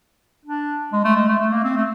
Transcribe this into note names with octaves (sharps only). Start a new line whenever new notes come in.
D4
G#3
A3
G#3
A3
A3
A#3
C4
A3